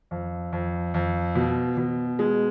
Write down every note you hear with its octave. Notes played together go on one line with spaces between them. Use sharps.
F2
F2
F2
B2
B2
G#3